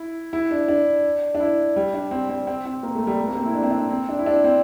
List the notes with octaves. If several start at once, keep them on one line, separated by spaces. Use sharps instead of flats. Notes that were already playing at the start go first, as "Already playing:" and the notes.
Already playing: E4
E4
D4
D4
D4
E4
G3
D4
C4
C4
C4
C4
A#3
A3
G3
A3
A#3
C4
E4
D4
C4
D4
C4
D4
E4
D4
C4